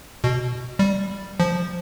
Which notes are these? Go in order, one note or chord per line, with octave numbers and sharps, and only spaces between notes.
B2
G3
F3